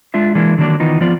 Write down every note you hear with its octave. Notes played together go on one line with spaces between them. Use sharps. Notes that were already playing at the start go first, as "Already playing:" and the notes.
G#3 D4 F4 E5
E3 G#3 A#3 D4 E4
D3 D#3 F#3 A#3 D4 D5
D#3 E3 B3 D#4 F4
F3 B3 C4 F4 D5